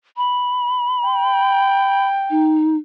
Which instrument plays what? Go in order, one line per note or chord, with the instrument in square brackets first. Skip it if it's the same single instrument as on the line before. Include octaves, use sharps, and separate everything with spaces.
[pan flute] B5
[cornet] G5
[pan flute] D#4